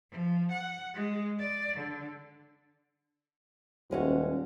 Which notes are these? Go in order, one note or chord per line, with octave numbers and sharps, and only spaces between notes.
F3
F#5
G#3
D5
D3
D#1 G#3 C#4 F#4